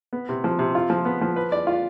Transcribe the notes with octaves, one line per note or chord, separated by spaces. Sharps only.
B3
C3
F3
C3
F4
F3
B3
F3
B4
D5
F4